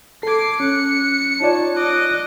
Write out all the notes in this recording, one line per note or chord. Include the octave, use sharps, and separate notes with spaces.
A4 D6 G#6 C7
C#4 F#6 C#7
D#4 F4 C#5 D5 A5
D#5 D6 F#6